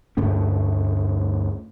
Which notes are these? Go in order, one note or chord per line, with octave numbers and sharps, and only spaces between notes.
D2 G2 A3 C#4